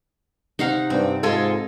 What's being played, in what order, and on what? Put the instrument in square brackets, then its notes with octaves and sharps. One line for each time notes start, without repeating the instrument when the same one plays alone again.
[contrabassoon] C3 [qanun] D#4 F5 F#5
[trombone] G2 [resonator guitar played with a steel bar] C4
[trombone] G#2 [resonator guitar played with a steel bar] G#3 F4 A4